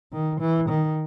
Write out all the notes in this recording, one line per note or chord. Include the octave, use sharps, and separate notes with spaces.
D#3
E3
D#3